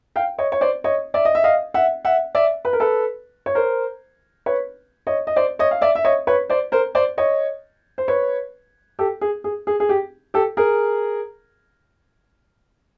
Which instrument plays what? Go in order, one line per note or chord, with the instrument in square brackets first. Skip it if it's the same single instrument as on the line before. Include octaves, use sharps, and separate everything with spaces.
[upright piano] F5 G5
C#5 D#5
C#5
C5 D5
C#5 D#5
D5 E5
D#5
E5
D#5 F5
E5 F#5
E5 F#5
D5 E5
B4
A#4
A4 B4
C#5
A#4 C5
B4 C#5
C#5 D#5
D#5
C5 D5
C#5 D#5
F5
D5 E5
E5
C#5 D#5
B4 C#5
C5 D5
A#4 C5
C5 D5
C#5 D#5
C5
B4 C#5
G4 A4
G#4
G#4
G#4
G#4
G4
G4 A4
G#4 A#4